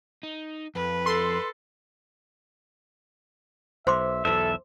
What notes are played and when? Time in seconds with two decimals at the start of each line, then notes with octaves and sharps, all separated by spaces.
0.23 D#4
0.75 F2 B4
1.06 A4 C6
3.87 B1 C5 E5 C6 D6
4.25 B1 E2 A4 E5